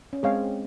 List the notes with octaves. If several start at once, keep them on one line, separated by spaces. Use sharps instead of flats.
C#4
G#3 C4 G#4 C#5 F5